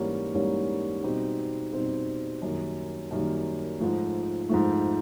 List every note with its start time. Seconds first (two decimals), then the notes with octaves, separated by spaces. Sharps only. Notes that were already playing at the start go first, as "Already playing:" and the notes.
Already playing: G#2 E3 G3 A#3 C#4
0.34 G#2 E3 G3 A#3 C#4
1.03 B2 G3 C4 D#4 G4
1.73 B2 G3 C4 D#4 G4
2.42 F#2 D#3 G3 A#3
3.11 F#2 D#3 G3 A#3
3.80 G#2 F3 A3
4.49 G#2 F3 A3